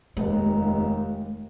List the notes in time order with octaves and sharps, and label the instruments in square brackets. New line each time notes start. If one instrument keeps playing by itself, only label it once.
[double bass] F1 D#2 [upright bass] G#3